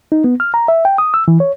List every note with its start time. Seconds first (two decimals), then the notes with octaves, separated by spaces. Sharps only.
0.12 D#4
0.24 B3
0.40 F6
0.54 A#5
0.68 E5
0.85 G5
0.98 D#6
1.14 E6
1.28 E3
1.40 C#5